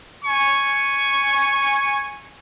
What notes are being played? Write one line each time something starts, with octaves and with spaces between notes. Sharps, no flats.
G#5 C#6